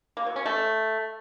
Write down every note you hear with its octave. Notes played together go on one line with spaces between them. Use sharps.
A#3
F#3
C#4
A3